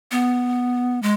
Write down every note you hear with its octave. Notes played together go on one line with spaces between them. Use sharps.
B3
G#3